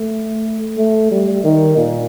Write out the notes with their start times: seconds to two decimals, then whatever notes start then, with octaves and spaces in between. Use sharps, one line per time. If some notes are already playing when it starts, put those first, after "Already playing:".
Already playing: A3
0.78 A3
1.11 G3
1.44 D#3
1.76 A#2